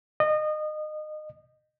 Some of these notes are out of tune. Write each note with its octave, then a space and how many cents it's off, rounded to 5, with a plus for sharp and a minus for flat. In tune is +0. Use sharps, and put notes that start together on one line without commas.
D#5 -25